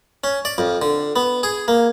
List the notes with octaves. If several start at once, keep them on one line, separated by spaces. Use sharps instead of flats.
C#4
D5
F2
D3
B3
G#4
A#3